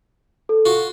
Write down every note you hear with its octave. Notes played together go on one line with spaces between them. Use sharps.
A4
F4 F#4